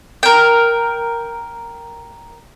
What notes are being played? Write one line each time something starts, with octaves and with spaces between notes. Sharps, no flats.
A#4 G5